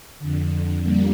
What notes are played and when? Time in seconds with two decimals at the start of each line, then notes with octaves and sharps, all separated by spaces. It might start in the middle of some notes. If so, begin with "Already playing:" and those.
0.19 F2 D3
0.82 G3 A#3